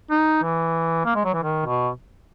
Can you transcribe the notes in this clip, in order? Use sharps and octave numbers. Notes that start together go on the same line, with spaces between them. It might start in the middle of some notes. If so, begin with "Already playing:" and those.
D#4
E3
A#3
G#3
F#3
E3
D#3
B2